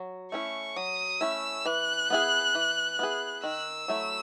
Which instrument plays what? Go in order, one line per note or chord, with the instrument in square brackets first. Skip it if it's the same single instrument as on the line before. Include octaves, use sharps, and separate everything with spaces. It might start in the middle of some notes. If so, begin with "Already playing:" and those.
Already playing: [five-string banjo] F#3
[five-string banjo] A3 C#4 E4 [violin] C#6
[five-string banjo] F#3 [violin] D#6
[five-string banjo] A3 C#4 E4 [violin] E6
[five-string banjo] E3 [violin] F#6
[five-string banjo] B3 E4 G#4
E3
B3 E4 G#4
[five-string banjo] D#3 [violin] E6
[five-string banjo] F#3 A3 E4